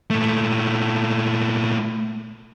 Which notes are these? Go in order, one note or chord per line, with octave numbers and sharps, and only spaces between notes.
A#2 A3